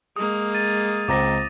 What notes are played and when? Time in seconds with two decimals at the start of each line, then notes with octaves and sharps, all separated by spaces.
0.16 G#3 A#3 D#6
0.54 A6 D#7
1.08 C#2 C4 A#5 D6 A#6